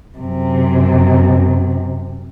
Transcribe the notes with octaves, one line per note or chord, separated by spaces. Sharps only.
F#2 C3